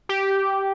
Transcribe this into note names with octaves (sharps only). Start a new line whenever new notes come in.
G4